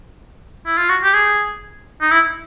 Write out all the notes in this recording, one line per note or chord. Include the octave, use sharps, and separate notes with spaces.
E4
F4
F#4
G4
G#4
D#4
E4